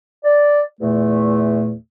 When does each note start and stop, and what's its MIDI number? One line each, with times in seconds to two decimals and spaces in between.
0.25 0.61 74
0.81 1.73 40
0.81 1.73 46
0.81 1.73 57